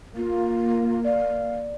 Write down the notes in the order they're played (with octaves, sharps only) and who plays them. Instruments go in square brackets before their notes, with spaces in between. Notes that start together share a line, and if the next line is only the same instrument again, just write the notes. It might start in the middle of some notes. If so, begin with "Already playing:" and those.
[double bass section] A#3 [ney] F4
[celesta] D5 [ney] F5